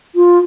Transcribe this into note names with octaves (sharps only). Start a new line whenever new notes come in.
F4